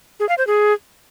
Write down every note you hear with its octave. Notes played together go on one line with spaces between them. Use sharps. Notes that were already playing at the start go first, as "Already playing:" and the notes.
G#4
F5
C5
G#4